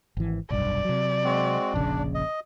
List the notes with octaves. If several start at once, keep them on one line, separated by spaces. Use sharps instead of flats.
G#1 E3
F1 B1 G2 D5
C3 F#3
G#3 C4 F#4
F1 A#1 C#3 D4
D#5